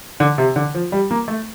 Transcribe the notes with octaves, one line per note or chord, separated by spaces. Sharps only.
D3
C3
D3
F3
G3
A#3
A3